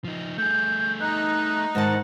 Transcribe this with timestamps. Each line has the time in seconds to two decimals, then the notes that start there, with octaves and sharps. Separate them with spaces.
0.04 F3 D#4
0.38 A3 G#4 G6
1.01 D#4 F#6
1.75 G#2 D#3 F#5 A5